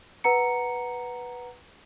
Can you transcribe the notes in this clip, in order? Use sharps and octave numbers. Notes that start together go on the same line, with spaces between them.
B4 F#5 A#5 C#7